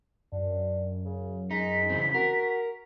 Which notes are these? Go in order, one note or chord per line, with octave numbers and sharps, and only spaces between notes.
F#2 D4
C#3
G#3 D#4 B6
C#3 E3 C4
F#4 A#4